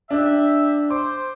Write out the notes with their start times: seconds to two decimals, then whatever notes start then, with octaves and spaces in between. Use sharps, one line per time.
0.11 D4 G4 E5
0.91 C5 D6